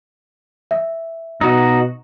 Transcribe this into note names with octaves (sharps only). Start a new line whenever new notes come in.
E5
B2 D#4 F#4